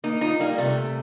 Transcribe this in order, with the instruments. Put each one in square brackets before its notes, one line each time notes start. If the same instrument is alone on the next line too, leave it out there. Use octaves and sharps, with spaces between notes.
[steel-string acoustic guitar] A#3 [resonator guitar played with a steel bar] D#4
[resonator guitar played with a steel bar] D#4 [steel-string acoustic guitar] F4
[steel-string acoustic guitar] G3 [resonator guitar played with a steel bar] A#3
[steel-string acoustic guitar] C3 [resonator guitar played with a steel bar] A3
[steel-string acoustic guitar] C3